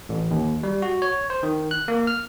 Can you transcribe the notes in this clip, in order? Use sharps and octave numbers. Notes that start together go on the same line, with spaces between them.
A1
D#2
G3
F#4
C#5
C5
D#3
F#6
A#3
F6